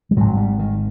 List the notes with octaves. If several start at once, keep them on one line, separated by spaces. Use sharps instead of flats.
G3
G#1 G#2 F#3
G3
D#3